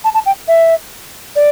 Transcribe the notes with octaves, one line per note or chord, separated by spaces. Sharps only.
A5
A5
G5
E5
D5